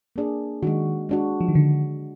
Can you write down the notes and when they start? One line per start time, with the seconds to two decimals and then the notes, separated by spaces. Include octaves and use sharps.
0.16 A#3 D4 G#4 D5
0.63 D#3 G#3 D4 F#4
1.09 G#3 D4 F#4
1.41 F3
1.48 D#3
1.55 D3